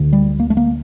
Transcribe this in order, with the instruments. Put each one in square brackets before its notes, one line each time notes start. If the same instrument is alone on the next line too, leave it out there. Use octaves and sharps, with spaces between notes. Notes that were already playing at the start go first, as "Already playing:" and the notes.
Already playing: [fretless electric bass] D2 D3
G3
A#3
A3
A#3